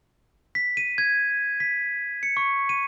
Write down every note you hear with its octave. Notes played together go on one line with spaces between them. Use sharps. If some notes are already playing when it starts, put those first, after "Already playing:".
B6
D#7
G#6
B6
C#7
C#6
D#7